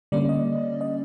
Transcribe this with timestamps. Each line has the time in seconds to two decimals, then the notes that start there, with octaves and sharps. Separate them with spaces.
0.12 D3 G3 A#3 C#4 D5
0.29 D#5
0.81 D#5